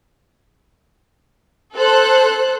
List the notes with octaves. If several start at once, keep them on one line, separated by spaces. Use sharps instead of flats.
A4 C5 F#6